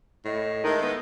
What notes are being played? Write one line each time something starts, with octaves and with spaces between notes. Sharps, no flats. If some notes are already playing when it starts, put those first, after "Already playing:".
A2 D#5
D#3 G#3 E4 A4
B3